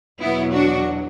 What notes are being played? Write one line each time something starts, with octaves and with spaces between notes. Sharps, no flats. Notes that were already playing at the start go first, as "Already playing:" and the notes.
E2 B2 F#3 B3 E4
D4 F#4